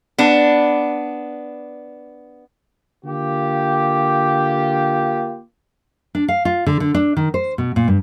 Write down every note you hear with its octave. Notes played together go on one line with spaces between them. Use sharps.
B3 D4
D3 A#3 F4 G4
D4
F5
F4
D3
D3
D4
D#3
C5
B2
A#2
G2